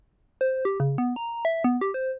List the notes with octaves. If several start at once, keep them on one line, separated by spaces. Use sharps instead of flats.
C5
G4
C#3
B3
A#5
E5
B3
G4
C5